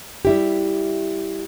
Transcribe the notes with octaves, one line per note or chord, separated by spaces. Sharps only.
G3 E4 G4